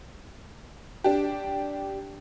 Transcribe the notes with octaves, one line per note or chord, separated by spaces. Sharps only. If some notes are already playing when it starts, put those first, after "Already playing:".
D4 G4